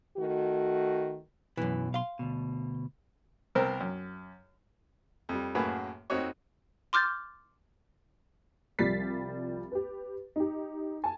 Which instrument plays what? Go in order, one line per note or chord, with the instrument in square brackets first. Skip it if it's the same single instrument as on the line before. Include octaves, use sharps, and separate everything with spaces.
[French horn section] D#3 A3 F#4
[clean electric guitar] B1 B2 [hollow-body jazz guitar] F#2 E3
[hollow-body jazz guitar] F5 C6
[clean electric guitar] D2 B2
[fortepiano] C2 B3 C4 A#4 C5 A#5
F#2
F2 G3
F#2 A2 A#3 F#4 G#4 B4
F2 C4 D#4 F#4 C#5
[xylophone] C6 D6 F6 G6 A6
[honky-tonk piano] C2 F3 G3 A6 B6 C7
G4 B4
D#4 G4
G#5 A5